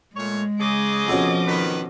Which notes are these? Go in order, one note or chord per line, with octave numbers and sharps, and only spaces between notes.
A#2 G#3 A3 C#5
C#3 G#4 D#5 D6
F2 B2 F3 C#4
D#3 B4